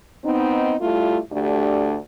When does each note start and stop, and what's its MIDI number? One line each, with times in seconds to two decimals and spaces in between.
0.25 0.76 59
0.25 0.76 60
0.25 0.76 63
0.80 1.18 55
0.80 1.18 57
0.80 1.18 64
0.80 1.18 65
1.31 1.96 38
1.31 1.96 57
1.31 1.96 62
1.31 1.96 67